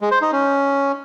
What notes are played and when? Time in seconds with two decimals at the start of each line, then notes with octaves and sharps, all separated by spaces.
0.01 G#3
0.11 C5
0.22 D#4
0.32 C#4